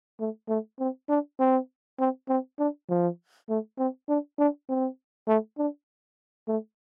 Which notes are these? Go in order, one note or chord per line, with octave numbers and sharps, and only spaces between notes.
A3
A3
C4
D4
C4
C4
C4
D4
F3
A3
C4
D4
D4
C4
A3
D4
A3